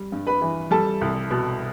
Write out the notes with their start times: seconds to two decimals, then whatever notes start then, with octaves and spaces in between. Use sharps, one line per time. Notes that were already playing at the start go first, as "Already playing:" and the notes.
Already playing: G3
0.12 G2
0.27 B4 B5
0.42 E3
0.71 G3 A4 A5
1.01 C2
1.31 B2